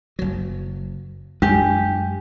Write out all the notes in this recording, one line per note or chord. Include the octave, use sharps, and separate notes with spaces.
F#1 F#3
F#2 G#3 D4 G4 G#5